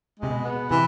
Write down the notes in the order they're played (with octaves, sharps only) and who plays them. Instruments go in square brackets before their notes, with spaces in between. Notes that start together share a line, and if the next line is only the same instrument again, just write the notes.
[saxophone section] G#3
[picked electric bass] C3
B2
[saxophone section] B3
[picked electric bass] C3 [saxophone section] E3